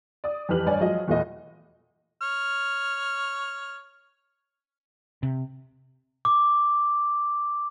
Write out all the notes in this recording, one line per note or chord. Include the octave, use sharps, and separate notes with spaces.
D5 D#6
F2 E3 G4 B4 F6 F#7
A1 G2 C#5 D5 G#5
F3 F#3 G#3 D#5
E2 A#2 E3 A3 D#5
C#5 F6
C3
D6